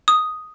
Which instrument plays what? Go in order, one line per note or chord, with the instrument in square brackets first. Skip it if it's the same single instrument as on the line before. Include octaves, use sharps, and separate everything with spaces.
[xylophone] D#6